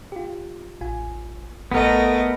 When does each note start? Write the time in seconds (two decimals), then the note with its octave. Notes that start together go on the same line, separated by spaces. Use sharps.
0.12 F4 G4
0.81 A1 F4 G#5
1.72 A1 A3 B3 A#4 D#5 A#6 C#7